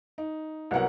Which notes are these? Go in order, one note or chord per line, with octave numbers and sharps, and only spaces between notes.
D#4
C2 F#3 B3 A#4 C#5 F#5